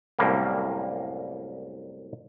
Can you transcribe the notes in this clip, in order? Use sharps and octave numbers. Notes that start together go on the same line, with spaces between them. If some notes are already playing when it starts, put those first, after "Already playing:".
C2 F#2 A2 G3 A#3